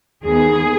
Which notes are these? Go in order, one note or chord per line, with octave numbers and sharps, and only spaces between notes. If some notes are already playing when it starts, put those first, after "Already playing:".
D#2 D#3 B3 G#4